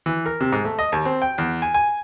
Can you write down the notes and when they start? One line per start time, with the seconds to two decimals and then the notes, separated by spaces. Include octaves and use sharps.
0.06 E3
0.26 A#4
0.41 C3
0.52 G#2
0.65 A3
0.79 D#5
0.92 D#2
1.05 C4
1.22 G5
1.38 E2
1.62 G#5
1.74 G#5